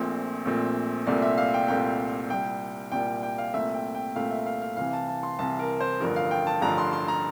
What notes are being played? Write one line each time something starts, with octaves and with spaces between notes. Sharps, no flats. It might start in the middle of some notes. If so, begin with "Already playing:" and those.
Already playing: A#1 A#2 A3 C4
A#1 A#2 A3 C4
C2 A#2 A3 C4 D5
E5
F5
G5
C2 A#2 A3 C4 G5
C2 A#2 G3 G5
C2 A#2 G3 G5
G5
F5
C2 A#2 A3 C4 E5
G5
G5
C2 A#2 A3 C4 F5
E5
F5
F5
C2 C3 E3 F5
A5
A5
C6
C2 C3 E3 A5
A#4
C5
A1 G2 D3 F3 A#4
F5
G5
A5
A1 G2 D3 F3 A#5
C6
C6
A#5